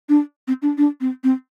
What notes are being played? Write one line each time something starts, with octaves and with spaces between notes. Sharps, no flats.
D4
C4
D4
D4
C4
C4